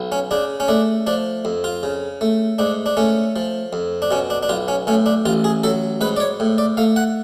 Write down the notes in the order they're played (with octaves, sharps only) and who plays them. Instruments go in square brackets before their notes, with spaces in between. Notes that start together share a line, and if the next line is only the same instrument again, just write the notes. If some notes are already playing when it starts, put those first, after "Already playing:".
Already playing: [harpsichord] B1
C#4
C#3 D4
C#4
A3 D4
F3 D4
F2
F4
C#3
A3
G#2 D4
D4
A3 C#4
F3
F2
D4
B2 C#4
D4
D4
B1 F4
C#4
A2 C#4
D4
A1 F4
G#4
F#3 A4
G#2 B4
D5
C#5
A2
D5
A3 F5
F#5